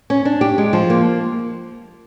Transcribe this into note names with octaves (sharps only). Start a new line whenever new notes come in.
C#4
D4
G4
G#3
F3
A#3